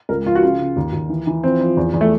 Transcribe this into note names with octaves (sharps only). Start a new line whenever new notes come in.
C#2 A#4
F3 F4
F#4
C#3 F4
C#3
D#2
D#2
E3
E3
F3 C4
F3
E2
E2
A3